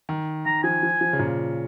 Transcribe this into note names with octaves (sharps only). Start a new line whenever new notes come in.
D#3
D#3 A#5
F3 G#5
F3
F3
C#3
A#2